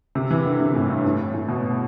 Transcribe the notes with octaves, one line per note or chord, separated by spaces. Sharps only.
C3
E3
D3
C3
A2
G2
A2
A2
B2